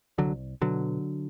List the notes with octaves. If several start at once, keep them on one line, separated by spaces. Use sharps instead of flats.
C2 D3 F#3
B2 D3 F#3